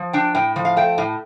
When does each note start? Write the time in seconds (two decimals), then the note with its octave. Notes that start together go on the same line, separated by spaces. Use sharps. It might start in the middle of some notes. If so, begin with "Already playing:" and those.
Already playing: F3
0.13 D4 G5
0.35 A2 G5
0.56 F3
0.65 F5
0.77 A3 G5
0.98 A2